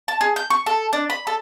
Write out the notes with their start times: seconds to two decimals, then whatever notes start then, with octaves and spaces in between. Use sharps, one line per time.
0.08 A5
0.21 G#4
0.36 G6
0.50 C#6
0.66 A4
0.93 D4
1.10 B5
1.27 A4